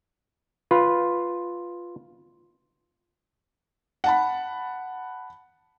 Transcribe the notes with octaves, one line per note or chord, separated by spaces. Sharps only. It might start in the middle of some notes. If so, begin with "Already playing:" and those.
F4 B4
F#5 A5 B5